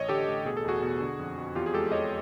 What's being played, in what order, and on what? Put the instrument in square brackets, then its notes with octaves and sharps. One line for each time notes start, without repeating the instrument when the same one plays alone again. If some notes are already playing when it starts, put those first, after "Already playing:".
Already playing: [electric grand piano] A1 C#5 D#5
D3 G4 A4
A1
B2 G#4
A4
E2 F#4 G#4
B2
D3
F2
F2
E2 F4 G4
G#4
G#3 G4 A4
E2 C#5 D#5